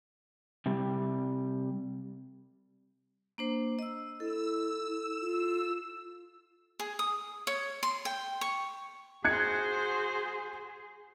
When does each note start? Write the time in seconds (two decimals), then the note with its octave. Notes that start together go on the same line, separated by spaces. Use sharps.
0.66 C3 G3
3.38 A#3 D4 C5
3.79 D#5 E6
4.20 E4 A4 E6
5.21 F4
6.79 G#4
6.99 D#6
7.47 C#5
7.83 C6
8.05 G5
8.41 C#6
9.24 F#4 G#4 C5 F#6 G#6 C#7